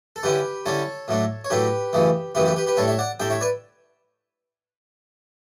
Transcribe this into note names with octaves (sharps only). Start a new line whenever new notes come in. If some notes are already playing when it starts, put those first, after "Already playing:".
A4
D3 G3 C#4 E4 G4 B4
D3 G3 C#4 E4 A4 C#5
A2 F#3 A3 D4
C#5
A2 F#3 A3 D4 G4 B4
F#2 C#3 E3 A3
F#2 C#3 E3 A3 G4 B4
G4 B4
G4 B4
G4 B4
A2 G3 D4 A4 C#5
C#5 E5
D5 F#5
A2 G3 D4 E5 G5
C#5 E5
B4 D5